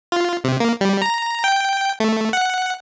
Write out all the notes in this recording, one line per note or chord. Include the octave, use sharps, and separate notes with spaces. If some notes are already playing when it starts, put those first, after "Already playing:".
F4
C3
A#3
G3
A#5
G5
A3
F#5